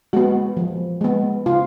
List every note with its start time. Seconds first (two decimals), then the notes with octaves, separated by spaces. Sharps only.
0.13 G#3 B3 F#4
0.57 F3
1.01 G#3 B3
1.46 C#3 F4